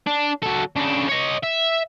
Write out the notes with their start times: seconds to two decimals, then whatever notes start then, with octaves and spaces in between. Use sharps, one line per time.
0.07 D4
0.43 F#3 A4
0.76 C#3 D4
1.09 C#5 D#5
1.43 E5